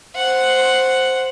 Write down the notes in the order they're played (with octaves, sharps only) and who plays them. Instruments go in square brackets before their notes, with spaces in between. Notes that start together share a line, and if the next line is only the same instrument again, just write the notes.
[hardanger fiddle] C5 F#5